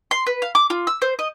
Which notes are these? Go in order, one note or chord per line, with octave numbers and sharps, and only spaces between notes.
C6
B4
F5
D6
F4
E6
C5
D#5